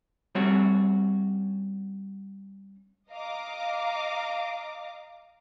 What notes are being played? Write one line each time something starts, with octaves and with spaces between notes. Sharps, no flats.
G3 C4 C#4 F#4
D#5 F5 A#5 D6